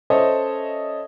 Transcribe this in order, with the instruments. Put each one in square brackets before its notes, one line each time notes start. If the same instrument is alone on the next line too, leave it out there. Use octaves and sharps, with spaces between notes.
[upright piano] C#4 A4 C5 C#5 D#5 E5